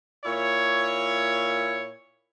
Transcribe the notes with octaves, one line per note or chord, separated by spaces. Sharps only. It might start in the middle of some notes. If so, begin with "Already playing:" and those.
A#2 E4 C#5